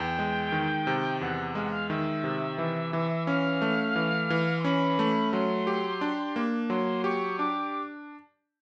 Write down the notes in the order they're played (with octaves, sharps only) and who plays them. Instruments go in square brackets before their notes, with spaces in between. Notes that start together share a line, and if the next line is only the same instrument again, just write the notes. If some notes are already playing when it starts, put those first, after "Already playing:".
Already playing: [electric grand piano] E2 [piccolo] G5
[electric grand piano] G#3
D#3
C3
[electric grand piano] E2 [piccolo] F#5
[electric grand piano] G#3 [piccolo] F5
[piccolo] F#5
F5
[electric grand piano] D#3 [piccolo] E5
[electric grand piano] C3
E3
E3
[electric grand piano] C#4 [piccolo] F5
[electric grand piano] A3
E3
E3
[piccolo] C6
[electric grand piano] C#4 [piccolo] B5
[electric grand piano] A3
[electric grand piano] F#3 [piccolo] C6
[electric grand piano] G4
D4
A#3
[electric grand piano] F#3 [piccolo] C6
[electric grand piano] G4 [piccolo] C#6
[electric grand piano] D4 [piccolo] D6